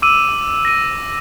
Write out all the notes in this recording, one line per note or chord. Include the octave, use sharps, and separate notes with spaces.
D6 E6 D#7
A#6 D#7